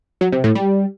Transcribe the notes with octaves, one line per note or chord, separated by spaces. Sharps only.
F#3
C3
A2
G3